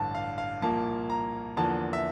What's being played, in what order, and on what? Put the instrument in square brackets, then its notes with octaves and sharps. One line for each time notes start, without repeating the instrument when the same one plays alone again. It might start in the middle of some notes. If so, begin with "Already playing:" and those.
Already playing: [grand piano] A1 G2 D3 A5
F5
F5
C2 A#2 F3 A#3 A5
A#5
E2 D3 F3 A#3 A5
E5